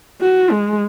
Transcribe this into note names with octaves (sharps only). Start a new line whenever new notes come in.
F#4
G#3